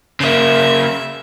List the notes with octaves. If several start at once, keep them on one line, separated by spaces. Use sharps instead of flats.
C#3 A#3 E5